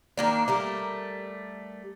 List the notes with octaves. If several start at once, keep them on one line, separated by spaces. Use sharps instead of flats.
D#3 A#3 D4
G3 A3 A#4